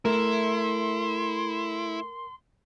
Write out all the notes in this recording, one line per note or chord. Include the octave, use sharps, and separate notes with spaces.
A3 E4 A#4 C6